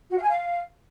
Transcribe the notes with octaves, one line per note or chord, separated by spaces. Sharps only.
F#4
F5
G#5
F5